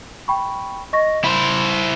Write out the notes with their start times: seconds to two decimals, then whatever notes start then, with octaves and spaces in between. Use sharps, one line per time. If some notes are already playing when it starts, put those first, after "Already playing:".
0.28 G5 B5 C#6
0.93 D#5 C#6 A#6
1.24 E4 C5 B5